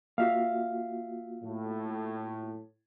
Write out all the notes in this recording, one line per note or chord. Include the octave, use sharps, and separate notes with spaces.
A#3 F4 F#4 E5 F5
A2